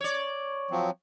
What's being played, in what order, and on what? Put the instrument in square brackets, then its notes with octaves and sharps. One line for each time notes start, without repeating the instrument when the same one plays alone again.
[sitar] C#5 D5
[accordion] F3 F#3 C4